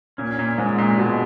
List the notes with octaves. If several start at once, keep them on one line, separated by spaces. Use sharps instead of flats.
A#2 C#4
A#2
G#2 G#3
A#2
B2 G#3